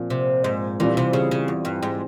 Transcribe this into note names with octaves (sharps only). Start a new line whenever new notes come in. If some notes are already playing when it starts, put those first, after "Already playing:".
Already playing: A#2 F3 C4
C3
G#2
A#2 E3 G3 C4 F4
C3
C#3
C#3
E2
G2
G#2